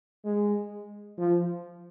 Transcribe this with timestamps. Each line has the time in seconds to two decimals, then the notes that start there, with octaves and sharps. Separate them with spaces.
0.25 G#3
1.18 F3